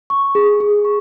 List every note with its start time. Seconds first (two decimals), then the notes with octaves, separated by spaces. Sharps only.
0.10 C#6
0.35 G#4
0.60 G#4
0.85 C#6